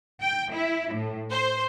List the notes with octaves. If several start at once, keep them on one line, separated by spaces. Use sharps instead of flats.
G5
E4
A2
C5